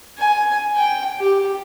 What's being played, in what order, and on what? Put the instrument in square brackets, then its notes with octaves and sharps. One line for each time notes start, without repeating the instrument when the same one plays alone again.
[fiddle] G#5
G5
G4